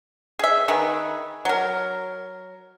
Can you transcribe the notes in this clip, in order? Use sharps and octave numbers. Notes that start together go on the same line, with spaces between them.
G#4 E5
D#3 G#4 B4
F#3 A#4